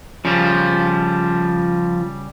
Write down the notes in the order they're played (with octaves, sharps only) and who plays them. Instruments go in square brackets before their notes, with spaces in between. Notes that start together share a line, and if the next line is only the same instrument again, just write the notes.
[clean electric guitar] C#3 G3 [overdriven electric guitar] F3